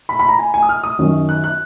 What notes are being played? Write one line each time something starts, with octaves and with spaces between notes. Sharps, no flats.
B5
B5
A#5
G#5
G#5
D#6
F6
D#6
F#2 D#3 F#3 C#4
F#6
F#6